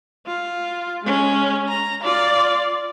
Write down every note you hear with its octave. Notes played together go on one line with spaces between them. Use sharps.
F4
G#3 C#4
A#5
F4 D5